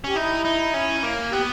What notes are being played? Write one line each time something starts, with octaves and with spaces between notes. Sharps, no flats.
C#4 G4
D#4 E4
D#4
C#4
A#3
B3 G4